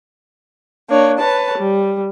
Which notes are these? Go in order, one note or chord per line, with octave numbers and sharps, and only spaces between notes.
A#3 D4 C#5
B4 C#5 A5
G3